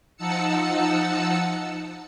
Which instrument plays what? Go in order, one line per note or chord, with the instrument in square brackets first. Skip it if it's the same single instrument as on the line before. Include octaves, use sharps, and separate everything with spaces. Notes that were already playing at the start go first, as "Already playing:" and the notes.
[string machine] F3 D#4 F#5 A5 E6 C#7